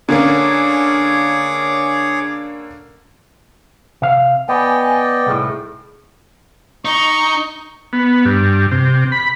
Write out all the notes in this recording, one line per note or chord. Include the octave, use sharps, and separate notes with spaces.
D3 A#3 C#4 G#4 C#5 D6
C3 F5
B3 D5 D#5 G5 G#5
C2 A2 A3 D#4 G#4
D#4 C#6
B3
G2
C3
B5